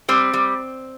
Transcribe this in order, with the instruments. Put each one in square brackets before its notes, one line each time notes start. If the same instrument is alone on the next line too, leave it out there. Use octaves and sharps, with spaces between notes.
[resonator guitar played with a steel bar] G3 C4
G3